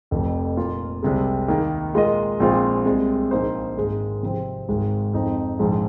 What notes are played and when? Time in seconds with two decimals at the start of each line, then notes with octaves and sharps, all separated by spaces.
0.11 F1 F2 F3
0.57 A#2 A#3 F4
1.03 C2 C3 G#3
1.48 D#2 D#3 A#3 G#4
1.94 A#2 G#3 F4 A#4 D#5
2.40 A#1 A#2 G#3 C4 F4
2.85 C2 C3 G#3
3.31 A#1 A#2 A#3 D#4 C5
3.77 G#1 G#2 G#3
4.23 C3 F3 C4
4.69 G#1 G#2 G#3
5.13 F2 F3 C4 D#4
5.59 A#1 G#2 F3 G#3 C4